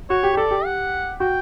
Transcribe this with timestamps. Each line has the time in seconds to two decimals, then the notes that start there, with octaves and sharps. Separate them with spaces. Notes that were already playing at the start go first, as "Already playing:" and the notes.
0.10 F#4 C#5
0.23 G4
0.33 G4
0.37 A4 D5
0.51 G4
0.65 F#5
1.20 F#4 G5